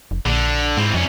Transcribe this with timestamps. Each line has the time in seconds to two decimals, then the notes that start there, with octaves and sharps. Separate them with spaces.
0.11 F1
0.26 A#1 D3
0.77 G#2 E3 C4
0.94 C2 F2 C#4